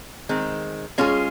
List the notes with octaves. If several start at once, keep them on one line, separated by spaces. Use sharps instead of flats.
D#3 G#3 C4
G#3 C#4 F4 G#4